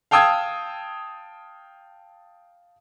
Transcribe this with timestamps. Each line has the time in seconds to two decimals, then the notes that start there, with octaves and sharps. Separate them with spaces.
0.11 F5 G5 A5 D#6 E6 G#6